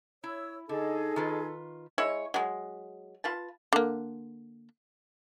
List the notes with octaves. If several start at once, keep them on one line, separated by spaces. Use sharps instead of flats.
E4 C#5 E6
D3 D#4 G#4 A4 D#5
D#3 F4 B4
G#3 E4 C#5
F#3 G#3
F4 B4 A5
D3 A#3